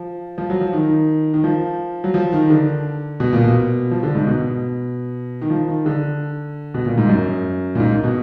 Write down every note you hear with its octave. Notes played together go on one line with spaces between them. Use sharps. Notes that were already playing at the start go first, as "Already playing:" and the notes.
Already playing: F3
F3
F#3
F3
D#3
D#3
F3
F#3
F3
D#3
D3
B2
A#2
B2
F3
D3
G#2
B2
D#3
F3
D#3
D3
B2
A#2
G#2
F#2
A#2
G#2
B2